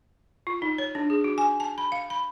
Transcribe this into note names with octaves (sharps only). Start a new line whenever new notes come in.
F4
D#4
C#5
D4
G#4
F#4
G#5
A5
B5
F5
B5